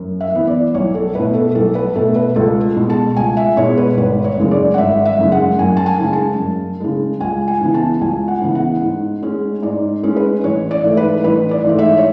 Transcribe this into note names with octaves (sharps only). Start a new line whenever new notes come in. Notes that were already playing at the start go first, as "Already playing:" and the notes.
Already playing: F#2
E5
E3 B3
D5
B1 C#5
A4
B2 A3 B4
A4
B1 A4
B4
B2 A3 A4
B4
C#2 A4
B2 G#3
A5
C#2 G#5
E5
B2 G#3 C#5
B4
G#1 B4
C#5
F#2 C#3 G#3
D5
F#5
G#1 E5
E5
F#2 C#3 G#3
F#5
F#2 G#5
A5
G#5
C#3 G#3
A5
F#2
C#3 G#3
C#2 G#5
G#5
C#3 E3 B3
A5
C#2 G#5
F#5
C#3 E3 B3
F#5
G#2
G#3 C#4
G#2 D5
G#3 C#4
B4
A1 C#5
D5
G#2 E3 A3
B4
A1 B4
D5
G#2 E3 A3
E5
C#5